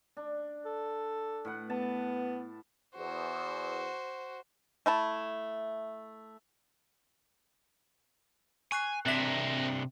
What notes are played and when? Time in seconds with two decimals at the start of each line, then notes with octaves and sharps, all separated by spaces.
0.17 D4
0.66 A4
1.45 A2 B4 F#5
1.70 B3 A5
2.96 E2 F#4 C5
4.86 A3 E4 A5
8.72 G#5 C#6 F#6 C7
9.06 C3 C4 D4 A#4 C5 E5 B6